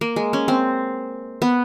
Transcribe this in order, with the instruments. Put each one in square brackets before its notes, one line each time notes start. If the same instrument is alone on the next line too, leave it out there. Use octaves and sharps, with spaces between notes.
[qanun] A#3
G#3
C#4
C4
B3